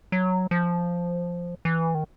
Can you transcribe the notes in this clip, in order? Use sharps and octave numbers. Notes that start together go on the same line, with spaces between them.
F#3
F3
E3
D#3